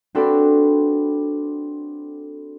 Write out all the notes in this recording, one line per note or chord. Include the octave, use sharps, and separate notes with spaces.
C4 D4 F#4 A4 B4 D5